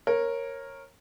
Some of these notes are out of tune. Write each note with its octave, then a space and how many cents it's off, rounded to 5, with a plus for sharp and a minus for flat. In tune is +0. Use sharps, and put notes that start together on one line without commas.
A#4 +0 C#5 -20